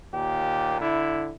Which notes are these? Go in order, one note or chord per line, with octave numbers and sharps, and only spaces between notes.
D#2 A#2 G4
D3 E4